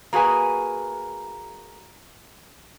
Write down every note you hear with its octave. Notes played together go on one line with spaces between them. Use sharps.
A#3 F#4 G#4 B4 G#5